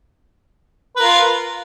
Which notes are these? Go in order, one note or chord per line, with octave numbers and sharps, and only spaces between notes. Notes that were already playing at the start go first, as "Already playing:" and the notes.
F4 A#4 B4